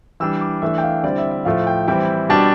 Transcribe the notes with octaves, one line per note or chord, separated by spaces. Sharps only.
E3 G3 D4 E6
D6
E3 A3 D4 E5
G5
F5
D3 G3 C4 E4 D5
E5
E5
A2 F3 A3 F5
G5
E3 G3 C4 E4 G5
B2 G3 D4 A5